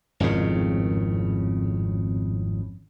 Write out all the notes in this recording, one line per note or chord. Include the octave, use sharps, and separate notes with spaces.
G#1 F2 A2 C#3